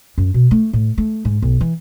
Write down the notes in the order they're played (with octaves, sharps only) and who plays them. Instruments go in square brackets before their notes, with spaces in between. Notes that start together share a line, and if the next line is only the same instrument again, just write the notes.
[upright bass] F#2
B2
A3
A2
A3
G#2
B1
E3